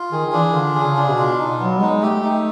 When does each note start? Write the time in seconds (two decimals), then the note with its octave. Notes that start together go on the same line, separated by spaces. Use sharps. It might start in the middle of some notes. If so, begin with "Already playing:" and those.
Already playing: F4
0.12 D#3 G#4
0.27 D#3
0.33 E3 D4
0.54 D3 F4
0.75 G#4
0.82 C#3
0.96 D4
1.10 B2
1.18 F4
1.38 D#4
1.59 F#3 B3
1.81 G#3 D#4
2.02 A3 G4
2.24 D#4